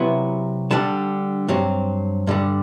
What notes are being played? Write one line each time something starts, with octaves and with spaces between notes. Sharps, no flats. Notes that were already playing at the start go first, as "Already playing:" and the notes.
Already playing: C3 F#3 B3 E4
D3 G3 D4 A5
G2 F#3 C4
G2 D3 G3